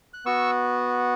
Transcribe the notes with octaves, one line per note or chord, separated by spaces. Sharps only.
F#6
B3 F#4 C#6 E6